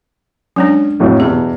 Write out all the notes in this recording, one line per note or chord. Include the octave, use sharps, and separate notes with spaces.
F#3 G#3 C#4 D4
F2 A2 F#3
E2 B2 G4